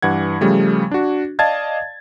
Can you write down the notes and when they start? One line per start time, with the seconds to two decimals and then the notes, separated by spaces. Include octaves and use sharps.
0.02 G2 E3 F#5 G#6
0.41 C#3 F3 G3 A3
0.91 D4 F#4
1.39 D5 D#5 F5 A5 G#6 A6